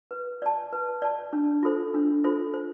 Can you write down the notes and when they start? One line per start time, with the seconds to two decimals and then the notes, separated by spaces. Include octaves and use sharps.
0.11 B4
0.42 D5 A5
0.73 B4
1.02 D5 A5
1.33 D4
1.63 F4 A4 C5
1.94 D4
2.24 F4 A4 C5
2.54 C5